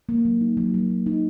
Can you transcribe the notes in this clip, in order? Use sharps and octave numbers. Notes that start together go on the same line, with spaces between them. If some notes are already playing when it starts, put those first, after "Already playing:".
A#3
F#3
D#4
F#3
A#3
F#3
D#4